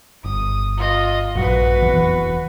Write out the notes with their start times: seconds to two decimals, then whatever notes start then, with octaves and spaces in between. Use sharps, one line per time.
0.24 G1 D#6
0.78 F4 D#5
1.35 A#1 G2 F#3 F#4 B4
1.81 F1 E2 E3